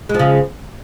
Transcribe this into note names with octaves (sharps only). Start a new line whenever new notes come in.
C#3 F3 G#3